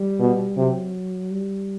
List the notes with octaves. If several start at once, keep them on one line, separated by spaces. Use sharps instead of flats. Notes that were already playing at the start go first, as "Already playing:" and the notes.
Already playing: G3
B2
C3 F#3
G3